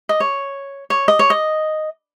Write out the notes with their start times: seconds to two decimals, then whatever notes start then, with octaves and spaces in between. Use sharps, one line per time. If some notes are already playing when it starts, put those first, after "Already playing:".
0.09 D#5
0.20 C#5
0.90 C#5
1.08 D#5
1.19 C#5
1.30 D#5